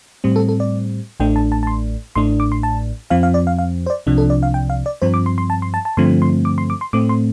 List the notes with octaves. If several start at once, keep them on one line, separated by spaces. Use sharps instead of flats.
A2 G3 C4
A4
A4
D5
A1 A2 A3 D4 G5
A5
A5
A5
C6
A1 A2 A3 D4 C6
D6
C6
A5
F2 F3 C4 F5
F5
D5
F5
F5
C5
D5
C2 C3 F3 D4
A4
D5
F5
G5
F5
D5
G2 F3 C4 C5
D6
C6
C6
A5
C6
A5
A5
G2 D3 F3 A3 C4 C6
C6
D6
C6
D6
C6
A2 A3 C4 D6
C6